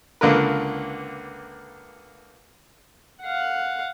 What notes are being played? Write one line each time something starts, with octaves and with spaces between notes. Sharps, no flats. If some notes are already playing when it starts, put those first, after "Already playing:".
C#2 D3 A#3 A#4 B4
F5 F#5